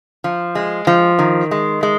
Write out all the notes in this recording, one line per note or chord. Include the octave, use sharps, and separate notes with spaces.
F3
G#3
F3
D#3
G#3
G#3